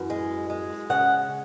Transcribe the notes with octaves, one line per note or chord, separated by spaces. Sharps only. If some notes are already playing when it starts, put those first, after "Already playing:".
Already playing: F#2 E3
G#3
G#3
C#3 F#5